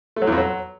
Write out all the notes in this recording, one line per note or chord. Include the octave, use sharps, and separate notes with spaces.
A3
F#3
E2
F2
F#3